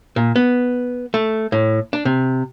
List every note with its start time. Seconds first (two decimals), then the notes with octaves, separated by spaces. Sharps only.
0.16 A#2
0.36 B3
1.14 A3
1.52 A2
1.93 D4
2.05 C3